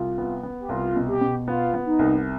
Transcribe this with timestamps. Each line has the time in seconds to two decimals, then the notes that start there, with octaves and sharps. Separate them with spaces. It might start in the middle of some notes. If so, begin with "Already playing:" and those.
Already playing: C2 F4
0.18 B3
0.43 B3
0.61 G4
0.69 C2 F4
0.96 B2
1.08 G4
1.21 B2
1.47 B3 F4
1.74 B3
1.86 D#4
1.99 C2